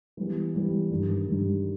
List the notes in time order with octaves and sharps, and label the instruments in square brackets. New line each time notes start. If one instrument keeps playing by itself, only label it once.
[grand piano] E3 G3 B3
E3 G3 B3
G2 D#3 G3
G2 D#3 G3